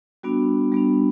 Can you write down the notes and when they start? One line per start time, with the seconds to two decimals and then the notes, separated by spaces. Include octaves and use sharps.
0.23 G3 B3 D4 F#4
0.72 G3 B3 D4